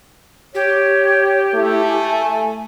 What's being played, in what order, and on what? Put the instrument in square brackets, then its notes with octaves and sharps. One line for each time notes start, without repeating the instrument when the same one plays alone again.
[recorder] G4 [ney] C#5
[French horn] A3 [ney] E4
[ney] G#5